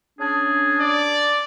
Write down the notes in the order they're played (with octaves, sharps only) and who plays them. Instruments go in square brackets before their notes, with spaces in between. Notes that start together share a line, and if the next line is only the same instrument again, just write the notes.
[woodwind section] C#4 D4 G#4
[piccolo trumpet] D5